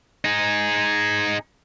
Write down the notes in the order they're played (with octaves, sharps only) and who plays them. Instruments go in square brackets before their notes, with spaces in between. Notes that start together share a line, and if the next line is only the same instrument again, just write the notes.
[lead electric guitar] D#4 G#4